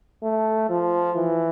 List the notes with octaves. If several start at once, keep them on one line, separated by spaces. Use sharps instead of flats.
A3
F3
E3